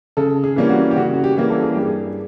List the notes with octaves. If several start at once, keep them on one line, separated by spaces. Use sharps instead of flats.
C#3 A4
G#4
E3 G3 A#3 C#4
F#4
G4
C#3 F#4
F#4
G4
E3 G3 A#3 C#4
A4
G#4
G2 G4
G#4